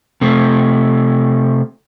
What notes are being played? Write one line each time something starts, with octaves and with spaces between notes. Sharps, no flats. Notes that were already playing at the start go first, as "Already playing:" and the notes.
C3 A3